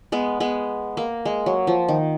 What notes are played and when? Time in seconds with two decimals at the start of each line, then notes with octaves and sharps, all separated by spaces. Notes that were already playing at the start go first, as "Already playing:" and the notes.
0.12 G#3 B3
0.40 G#3 B3
0.97 A#3
1.25 G#3
1.46 F#3
1.67 F3
1.88 D#3